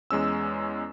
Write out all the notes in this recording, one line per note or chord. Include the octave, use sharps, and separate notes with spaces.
E2 G#3 C#4 E6